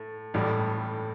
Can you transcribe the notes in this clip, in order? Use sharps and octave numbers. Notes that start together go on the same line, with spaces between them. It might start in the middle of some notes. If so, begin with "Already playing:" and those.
Already playing: A2
A1 A2 G3